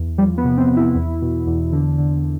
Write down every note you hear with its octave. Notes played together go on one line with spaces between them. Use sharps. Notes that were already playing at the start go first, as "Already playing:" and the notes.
Already playing: E2
F3 G3
B3
C3
C4
C3
E4
E2
B2
E2
D3
D3